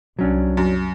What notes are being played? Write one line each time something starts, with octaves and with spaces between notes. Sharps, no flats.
C2 F#3 C#4 D4
F#2